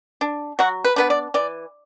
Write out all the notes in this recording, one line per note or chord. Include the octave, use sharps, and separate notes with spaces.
D4
F#3 F#4
B4
B3 D4 B4
D5
E3 D5